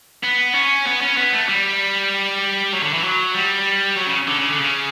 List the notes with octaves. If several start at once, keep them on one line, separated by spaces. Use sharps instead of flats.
B3
C#4
B3
C#4
B3
A3
G3
F#3
D3
E3
F#3
G3
F#3
C#3
D3
C#3
D3
C#3